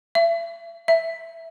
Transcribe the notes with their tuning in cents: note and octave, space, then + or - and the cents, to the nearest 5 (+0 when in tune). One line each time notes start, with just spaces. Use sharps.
E5 +35
E5 +10